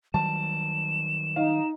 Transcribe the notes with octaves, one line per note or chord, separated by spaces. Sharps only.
D#3 F#3 G3 A5 E7
D#4 F5